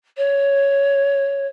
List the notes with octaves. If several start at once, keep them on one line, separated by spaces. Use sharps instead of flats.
C#5